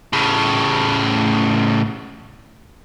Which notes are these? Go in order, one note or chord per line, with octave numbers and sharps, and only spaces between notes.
A2 C#3